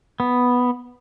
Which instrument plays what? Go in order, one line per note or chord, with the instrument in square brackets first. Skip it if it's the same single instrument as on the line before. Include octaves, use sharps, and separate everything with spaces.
[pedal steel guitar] B3